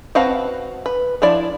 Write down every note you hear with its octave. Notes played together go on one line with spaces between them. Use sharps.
C4 F#4 B4 F5 A5
B4
F3 D4 E4 D5